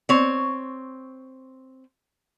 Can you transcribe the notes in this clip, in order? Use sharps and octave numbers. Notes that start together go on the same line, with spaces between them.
C4 C#5